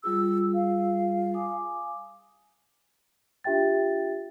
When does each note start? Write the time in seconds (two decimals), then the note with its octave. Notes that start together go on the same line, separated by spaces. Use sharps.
0.04 G3 F4 G#4 E6
0.54 F5
1.34 G#5 D6 D#6
3.44 D4 F4 G4 E5 G5 A6